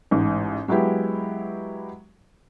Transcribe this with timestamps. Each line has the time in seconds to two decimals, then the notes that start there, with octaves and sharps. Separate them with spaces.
0.11 A1 G#2
0.68 F#3 G#3 B3 E4 G4